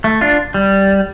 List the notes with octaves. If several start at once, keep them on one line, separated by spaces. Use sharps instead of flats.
A3
D4 F4
G3